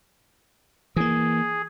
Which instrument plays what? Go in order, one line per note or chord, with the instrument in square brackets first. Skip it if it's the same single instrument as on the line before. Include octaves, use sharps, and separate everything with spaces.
[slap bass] E3 A#3 [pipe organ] G#4